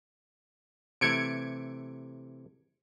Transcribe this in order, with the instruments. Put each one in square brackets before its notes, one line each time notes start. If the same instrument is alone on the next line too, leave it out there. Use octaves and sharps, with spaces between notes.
[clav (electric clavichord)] C3 E3 A3 [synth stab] G#6 C#7 D7